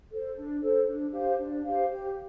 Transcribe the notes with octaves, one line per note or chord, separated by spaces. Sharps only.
A4 C5
D4
A4 C5
D4
G4 C5 F5
D4
G4 C5 F5
G4